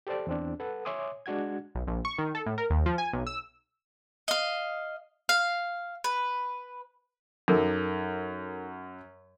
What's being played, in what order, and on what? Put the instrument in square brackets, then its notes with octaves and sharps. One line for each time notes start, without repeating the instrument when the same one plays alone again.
[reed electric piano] G4 A4 C5 D5 A5
E2 C4 D4
A4 B4 F#5
C#5 E5 G#5 C6 D6 D#6
G#3 D4 F#4 F#5 G#6
[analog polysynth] B1
A#1
C#6
D#3
A4
A2
A#4
D#2
F3
G#5
B1
E6
[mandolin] D#5 F5
F5
B4
[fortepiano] F#2 [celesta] D#4 A4 A#4